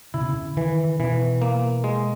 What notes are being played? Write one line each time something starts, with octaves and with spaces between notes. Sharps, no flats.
C#3 E4
B2
C#3
D#3 E3
B2 E3
A#3
G#3